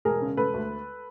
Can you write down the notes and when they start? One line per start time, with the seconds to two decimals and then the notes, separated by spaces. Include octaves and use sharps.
0.05 E1 G#4 A#4
0.22 C#3
0.37 E1 A4 B4
0.54 D2